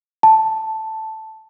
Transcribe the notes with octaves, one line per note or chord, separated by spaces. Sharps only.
A5